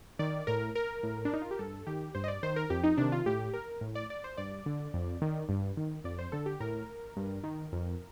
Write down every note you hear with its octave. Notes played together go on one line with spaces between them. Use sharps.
D#3 D5
A2 A#4
A#4
A2
D4
D#4
F4
G4
G2 A4
D#3 G4
G2 C5
D#5
D5
D#3 C5
A#4
F2 G4
D#4
C3 D#3 D4
F4
A2 G4
A#4
A2
D5
D5
C5
G2 D5
D3
F2
D#3
G2
D#3
F2 D5
C5
D3 A4
G4
A2 A#4
G2
D#3
F2